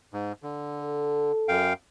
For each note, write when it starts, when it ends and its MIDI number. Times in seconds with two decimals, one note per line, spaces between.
0.13 0.32 44
0.43 1.32 50
0.82 1.65 69
1.48 1.73 42
1.48 1.73 77
1.48 1.73 79